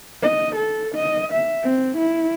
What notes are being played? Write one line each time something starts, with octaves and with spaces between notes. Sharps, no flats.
D#5
A4
D#5
E5
C4
E4